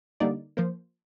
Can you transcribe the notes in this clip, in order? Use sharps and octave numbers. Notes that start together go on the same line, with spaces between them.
D3 G3 A#3 D#4 D5
F3 A#3 C5